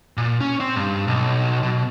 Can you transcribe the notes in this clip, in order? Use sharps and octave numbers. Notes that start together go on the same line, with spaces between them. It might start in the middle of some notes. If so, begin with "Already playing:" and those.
A#2
C#4
C4
G2
B1
B2